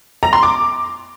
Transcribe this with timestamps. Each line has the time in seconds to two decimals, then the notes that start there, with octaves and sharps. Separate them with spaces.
0.23 A#5
0.33 C6
0.43 D6